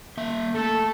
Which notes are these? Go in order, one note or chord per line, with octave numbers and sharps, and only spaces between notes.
A#3 E5
A3 A4